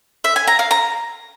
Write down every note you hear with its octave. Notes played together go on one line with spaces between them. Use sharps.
E5
G#5
A#5
F5
A#5